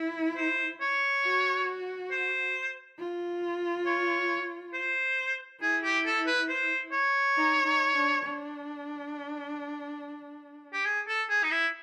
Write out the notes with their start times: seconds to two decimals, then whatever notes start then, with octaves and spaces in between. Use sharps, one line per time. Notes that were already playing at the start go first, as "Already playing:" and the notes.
Already playing: E4
0.37 C5
0.81 C#5
1.25 F#4
2.11 C5
2.99 F4
3.86 C#5
4.74 C5
5.61 E4 G#4
5.84 G4
6.06 A4
6.27 B4
6.49 C5
6.92 C#5
7.36 D#4
7.65 D#4
7.95 D4
8.24 D4
10.73 G4
10.85 G#4
11.08 A4
11.30 G#4
11.44 D#4
11.51 E4